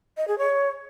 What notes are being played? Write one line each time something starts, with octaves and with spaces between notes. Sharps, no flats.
D#5
G#4
C#5